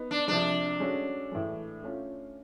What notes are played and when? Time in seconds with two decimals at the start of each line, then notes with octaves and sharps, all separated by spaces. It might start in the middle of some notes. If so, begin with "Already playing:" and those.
Already playing: B3 D#4
0.11 D4
0.28 C3 F3 G#3 D4
0.80 G#3 C#4 F#4 A4
1.32 A2 E3 G#3
1.84 A3 C#4 F4